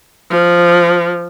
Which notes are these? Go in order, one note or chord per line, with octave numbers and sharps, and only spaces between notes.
F3